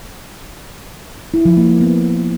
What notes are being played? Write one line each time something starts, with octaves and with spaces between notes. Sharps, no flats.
E4
F3
A#3
A#3
B3